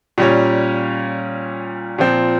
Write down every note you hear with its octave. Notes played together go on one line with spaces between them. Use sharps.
A#2 G3 C#4
A#2 F3 C4